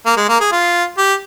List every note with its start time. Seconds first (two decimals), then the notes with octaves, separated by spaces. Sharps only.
0.06 A#3
0.17 G#3
0.29 A#3
0.40 G#4
0.52 F4
0.98 G4